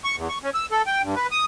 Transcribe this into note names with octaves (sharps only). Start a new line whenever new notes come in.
C#6
E2
C#6
C#4
E6
A4
G5
G2
B4
D#6